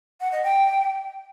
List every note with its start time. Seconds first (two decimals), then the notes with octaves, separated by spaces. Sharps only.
0.21 F#5
0.32 D#5
0.43 G5